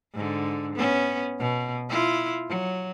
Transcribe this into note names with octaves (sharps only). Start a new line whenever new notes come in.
G#2 D3
B3 C#4
B2
E4 F4
F#3